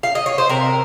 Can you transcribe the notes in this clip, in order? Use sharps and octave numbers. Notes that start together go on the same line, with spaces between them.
F5
D#5
C#5
C5
C3 A#4